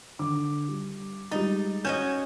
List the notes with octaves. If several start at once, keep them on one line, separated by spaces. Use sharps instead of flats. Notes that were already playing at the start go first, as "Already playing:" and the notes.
D3 D6
G3
G3 G#3 D#4 A6
C#4 F#4 D#5 G6 G#6 E7